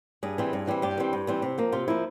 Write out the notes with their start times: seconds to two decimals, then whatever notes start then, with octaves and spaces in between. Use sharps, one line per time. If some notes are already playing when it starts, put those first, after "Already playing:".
0.23 G2 G#4
0.38 E3 G3 C4
0.53 G2
0.67 E3 G3 C4
0.82 G2 G4
0.97 E3 G3 C4
1.13 G2
1.27 E3 G3 C4
1.42 C3
1.58 F3 A#3
1.72 C3 F4
1.88 F3 A#3 E4